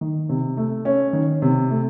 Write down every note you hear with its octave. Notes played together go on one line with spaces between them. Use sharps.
D#3
C3
A3
C#4
D#3
C3
A3